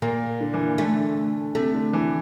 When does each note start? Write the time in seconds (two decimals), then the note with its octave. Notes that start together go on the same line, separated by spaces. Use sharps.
0.02 A#2 A#3
0.41 D3
0.54 E3
0.78 D3 A3
1.55 C3 A3
1.74 D3
1.93 E3